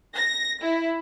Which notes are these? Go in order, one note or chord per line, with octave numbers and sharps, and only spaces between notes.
A#6
E4